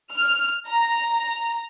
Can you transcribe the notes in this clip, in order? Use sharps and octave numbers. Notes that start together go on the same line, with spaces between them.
F6
A#5